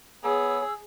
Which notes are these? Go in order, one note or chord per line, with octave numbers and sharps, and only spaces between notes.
B3 G#4 C#5 E6